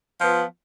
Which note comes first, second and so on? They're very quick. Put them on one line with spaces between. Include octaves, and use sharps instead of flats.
F3 B3 F4